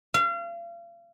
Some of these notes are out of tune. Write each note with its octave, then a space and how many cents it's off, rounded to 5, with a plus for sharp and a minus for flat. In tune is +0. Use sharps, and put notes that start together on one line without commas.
F5 -35